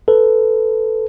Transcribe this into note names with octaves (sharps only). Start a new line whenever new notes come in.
A4 B4